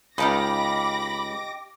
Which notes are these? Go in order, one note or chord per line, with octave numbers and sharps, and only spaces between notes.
C#2 D#4 G4 F5 B5 D6 A#6